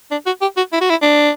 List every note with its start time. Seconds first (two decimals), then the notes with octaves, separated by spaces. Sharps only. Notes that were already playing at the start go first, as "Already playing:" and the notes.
0.11 D4
0.26 F#4
0.42 G4
0.57 F#4
0.72 E4
0.81 F#4
0.90 E4
1.02 D4